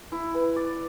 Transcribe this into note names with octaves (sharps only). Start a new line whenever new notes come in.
E4
B4
D5